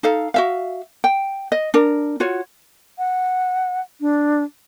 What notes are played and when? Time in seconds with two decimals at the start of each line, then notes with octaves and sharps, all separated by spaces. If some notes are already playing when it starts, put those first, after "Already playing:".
0.03 D#4 A4 F5
0.34 F#4 E5 F5
1.04 G5
1.52 D#5
1.74 D4 A#4
2.20 F4 F#4 C#5
2.98 F#5
4.01 D4